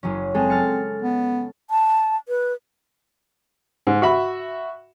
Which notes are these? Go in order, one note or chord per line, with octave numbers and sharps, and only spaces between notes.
F#1 F#3 C#4
G#3 C4 G#4 A4
F6 A6 C#7
B3
A5
B4
G#2
F#4 E5 B5